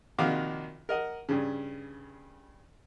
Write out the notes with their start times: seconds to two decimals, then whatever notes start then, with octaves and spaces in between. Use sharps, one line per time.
0.18 A#1 C3 D#3 F#4 F5 D6
0.89 A#4 D#5 F#5
1.29 G2 C#3